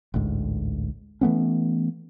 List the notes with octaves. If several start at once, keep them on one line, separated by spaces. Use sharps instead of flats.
A1 D2 G#2
E3 A3 B3 C#4